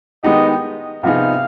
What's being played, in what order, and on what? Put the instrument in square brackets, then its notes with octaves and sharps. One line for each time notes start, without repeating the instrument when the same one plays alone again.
[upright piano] D#3 G#3 B3 D#4 G4 [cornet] D#5
[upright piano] C3 F3 B3 D#4 G#4 [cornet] F5